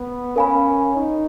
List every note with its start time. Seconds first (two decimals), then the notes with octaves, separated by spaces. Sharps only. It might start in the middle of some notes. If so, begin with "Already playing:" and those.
Already playing: B3
0.36 C#4 A#4 F5 G#5 B5
0.96 D#4